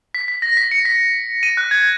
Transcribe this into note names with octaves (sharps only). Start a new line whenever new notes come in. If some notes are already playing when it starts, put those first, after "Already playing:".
B6
B6
A#6
B6
C#7
B6
D#7
F#6
G#6